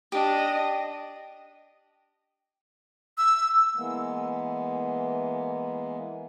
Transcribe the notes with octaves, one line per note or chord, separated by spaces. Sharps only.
D4 G4 D#5
E6
E3 G#3 A#3 B3